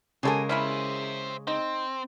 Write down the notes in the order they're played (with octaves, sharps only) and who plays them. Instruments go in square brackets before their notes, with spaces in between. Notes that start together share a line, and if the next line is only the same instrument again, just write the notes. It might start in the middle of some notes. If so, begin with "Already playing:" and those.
[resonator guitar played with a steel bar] C#3 G#3 A#4 [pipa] G4 A4 G#5
[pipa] C#4 E4 B5 [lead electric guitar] C5 E5
[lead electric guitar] C4 [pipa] D#4